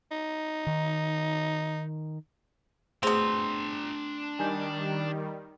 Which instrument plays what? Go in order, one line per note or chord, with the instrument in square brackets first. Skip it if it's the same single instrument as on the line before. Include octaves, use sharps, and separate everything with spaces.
[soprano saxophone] D#4
[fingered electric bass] D#3
[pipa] B2 C4 [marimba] A3 G#4 [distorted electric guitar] D4 A#5
[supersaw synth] D#3 G3 [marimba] G#5 G6